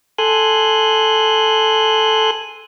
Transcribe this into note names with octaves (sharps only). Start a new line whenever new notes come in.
A4 G#5 C6 F#6